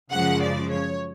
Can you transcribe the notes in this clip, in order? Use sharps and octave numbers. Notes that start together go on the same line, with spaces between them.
F#2 C#3 F3 G#3 F#5
D5
C#5